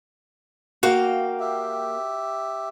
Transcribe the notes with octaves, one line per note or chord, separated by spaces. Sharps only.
A#3 F#4 F5 G5
G4 E5